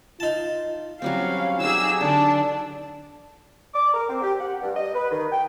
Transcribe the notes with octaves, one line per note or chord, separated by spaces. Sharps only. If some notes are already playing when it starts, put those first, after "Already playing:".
D#4 F4 A5
F#3 G3 C4 C#4 F5
F#3 D#4 G4 G#4 E6
D3 D4 A5
D6
A#4
C4
G4
F#5
G2
D#5
B4
D#3
G5